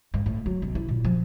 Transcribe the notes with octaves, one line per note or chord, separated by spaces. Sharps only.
G2
A2
F#3
B1
E4
A#2
F3